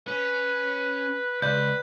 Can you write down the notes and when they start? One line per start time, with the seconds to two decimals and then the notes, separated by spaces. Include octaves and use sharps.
0.08 C#4 B4
1.42 C#2 B4 D5 G6